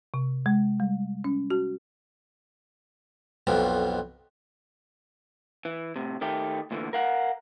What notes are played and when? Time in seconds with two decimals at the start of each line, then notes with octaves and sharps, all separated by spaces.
0.14 C3
0.46 G#3
0.80 G3
1.24 C#4
1.50 F#4
3.47 B1 F2 B2
5.65 E3
5.96 A2 C3
6.21 D#3 A3 G4
6.71 D2 A#2 D3 E3
6.93 A#4 F5 F#5